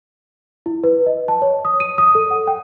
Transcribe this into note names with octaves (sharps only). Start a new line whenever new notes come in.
E4
B4
D#5
A5
C#5
D#6
D#7
D#6
A4
F#5
G5